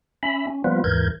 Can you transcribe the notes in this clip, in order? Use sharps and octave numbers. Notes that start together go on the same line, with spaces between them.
C#4 E5 B5
C#4
F3 G3 A#3 B3 F4 B4
D#2 G#2 E3 A#4 G6 G#6